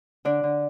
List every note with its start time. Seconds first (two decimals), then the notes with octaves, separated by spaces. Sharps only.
0.25 D3 D4 D5
0.43 D3